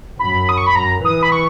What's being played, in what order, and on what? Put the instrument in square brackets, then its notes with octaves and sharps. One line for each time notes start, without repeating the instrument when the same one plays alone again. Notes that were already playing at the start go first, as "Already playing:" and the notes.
[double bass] F#2 [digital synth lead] B5
[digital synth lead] D#6
C#6
B5
[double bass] F#2 [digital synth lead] A#5
[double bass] E3 [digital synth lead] D#6
[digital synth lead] B5
C#6